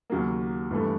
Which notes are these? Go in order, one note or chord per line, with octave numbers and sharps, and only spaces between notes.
D#2 C#3 F#3 A#3
G1 G2 E3 A3